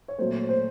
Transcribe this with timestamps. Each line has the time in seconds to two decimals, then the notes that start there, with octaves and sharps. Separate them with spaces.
0.08 C#5
0.18 A#2 F#3 A3 C5
0.49 C5